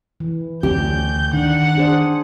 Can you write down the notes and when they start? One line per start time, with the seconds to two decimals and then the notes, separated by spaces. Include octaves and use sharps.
0.20 E3
0.63 D2 C#4 G4 G6
1.33 D#3 D4 F#5
1.75 D4 G#4 C5